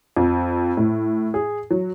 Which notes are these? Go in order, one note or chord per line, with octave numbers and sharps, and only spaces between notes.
F2
A2
G#4
F#3